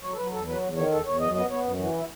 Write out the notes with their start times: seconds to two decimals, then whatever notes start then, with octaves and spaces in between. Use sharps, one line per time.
0.02 F#3 C#5
0.12 A4
0.17 F#3 B4
0.32 E2 A4
0.47 F#3 B4
0.62 E2
0.76 D#3 C#5
0.91 E2 A4
1.06 E2 C#5
1.20 F#2 D#5
1.35 B3 D#5
1.50 B3 C#5
1.64 F#2
1.79 E3 F#4
1.94 E4